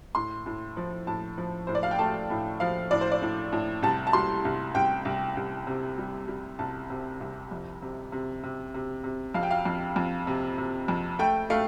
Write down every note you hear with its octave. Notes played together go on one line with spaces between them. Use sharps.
A2 C6
A2
F3
A2 A5
F3
A2 C5
D5
F5
G5
A3 A5
A2
F3 F5
A2 D5
C5
D5
A2
A2
C2 A5
A5
G3 C6
C2
C2 G5
C2
C2
C3
G3
G3
C2 A5
C3
C2
F2
C3
C3
C3
C3
C3
F2 F5
G5
F5
F2
F2
C3
C3
F2
A3 G5
A3 F5